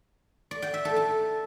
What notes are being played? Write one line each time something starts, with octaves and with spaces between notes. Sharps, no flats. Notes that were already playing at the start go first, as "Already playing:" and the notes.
D5
G5
E5
A4
A5